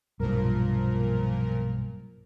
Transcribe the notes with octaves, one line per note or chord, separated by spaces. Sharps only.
B1 G2 A#2 F3 A#4